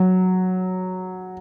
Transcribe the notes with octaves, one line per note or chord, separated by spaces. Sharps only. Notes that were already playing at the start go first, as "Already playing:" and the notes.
Already playing: F#3